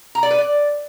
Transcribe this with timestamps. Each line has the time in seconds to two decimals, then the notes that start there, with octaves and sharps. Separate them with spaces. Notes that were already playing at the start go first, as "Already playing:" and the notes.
0.15 A#5
0.23 D5
0.31 B4
0.38 D5